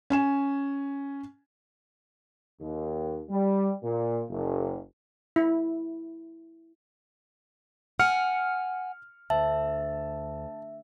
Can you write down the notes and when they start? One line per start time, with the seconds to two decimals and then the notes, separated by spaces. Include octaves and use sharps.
0.10 C#4 G#5 E7
2.61 D#2
3.30 G3
3.82 A#2
4.30 F#1
5.36 E4
8.00 F#5 G#5 F6 C#7
9.30 D2 E5 A5